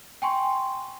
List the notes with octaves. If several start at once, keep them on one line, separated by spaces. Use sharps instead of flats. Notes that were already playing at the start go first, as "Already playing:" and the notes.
G5 G#5 C6 C#6